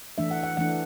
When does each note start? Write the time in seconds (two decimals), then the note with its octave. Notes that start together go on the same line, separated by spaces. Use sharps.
0.18 E3 A3 D4 E5
0.31 F#5
0.43 F#5
0.57 E3 A3 D4 F#5